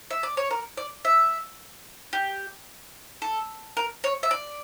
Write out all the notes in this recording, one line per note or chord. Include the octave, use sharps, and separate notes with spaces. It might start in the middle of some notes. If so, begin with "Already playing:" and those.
E5
D5
C#5
A#4
D5
E5
G4
A4
A#4
C#5
E5
D5